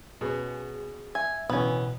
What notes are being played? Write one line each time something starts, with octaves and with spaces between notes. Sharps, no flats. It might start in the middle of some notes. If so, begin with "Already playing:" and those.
B2 B3 C#4 G#4
E5 G#5
A1 B2 D3 E3 B3 C#4